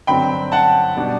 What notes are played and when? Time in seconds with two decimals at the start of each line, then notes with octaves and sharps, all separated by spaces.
0.07 G2 D3 F#3 C4 G5 B5
0.52 F#5 A5
0.97 B2 G3 D4